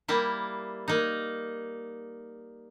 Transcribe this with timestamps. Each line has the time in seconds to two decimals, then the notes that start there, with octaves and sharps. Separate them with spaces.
0.08 G3 A#3 E4
0.88 A#3 D#4